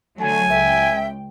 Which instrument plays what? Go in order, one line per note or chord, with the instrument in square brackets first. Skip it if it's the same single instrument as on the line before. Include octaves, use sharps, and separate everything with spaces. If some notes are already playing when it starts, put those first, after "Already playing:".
[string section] D3 F#3 A3 [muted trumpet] G#5
[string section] C#2 G5 [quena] E5